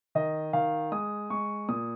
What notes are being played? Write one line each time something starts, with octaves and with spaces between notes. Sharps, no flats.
D#3 D#5
D#3 F5
G#3 D#6
G#3 C#6
A#2 D#6